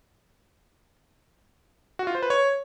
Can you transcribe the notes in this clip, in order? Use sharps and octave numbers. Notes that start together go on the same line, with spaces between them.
F#4
F4
C5
B4
C#5